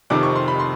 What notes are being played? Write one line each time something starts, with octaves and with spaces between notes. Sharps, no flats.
F1 F2 C3 D#3 D6
C#6
C6
B5
C6